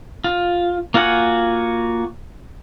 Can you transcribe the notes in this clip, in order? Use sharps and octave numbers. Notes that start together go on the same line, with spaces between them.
F4
A#3 F4 F#4 F#5 G#5